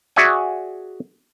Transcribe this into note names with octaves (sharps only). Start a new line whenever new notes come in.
F#4 G#4 D5 E5 F#5 G#5